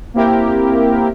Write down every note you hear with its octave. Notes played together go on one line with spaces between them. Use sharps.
A#3 C4 E4 G4 A#4